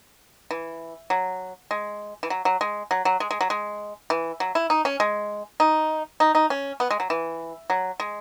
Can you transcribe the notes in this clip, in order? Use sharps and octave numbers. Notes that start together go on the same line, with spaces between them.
E3
F#3
G#3
E3
F#3
F#3
G#3
F#3
F#3
G#3
G#3
F#3
G#3
E3
F#3
E4
D#4
C#4
G#3
D#4
D#4
D#4
C#4
B3
G#3
F#3
E3
F#3
G#3